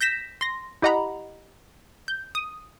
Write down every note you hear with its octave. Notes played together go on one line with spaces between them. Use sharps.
G6 A#6 B6 E7
C6 A#6
E4 G4 D#5 F#5 A#5 B5
G6
D#6